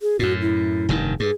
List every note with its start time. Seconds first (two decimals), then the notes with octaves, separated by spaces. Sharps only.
0.01 G#4
0.19 F#2 A2 F#4
0.41 E4
0.89 F1 G2 D#3
1.20 G2 G#4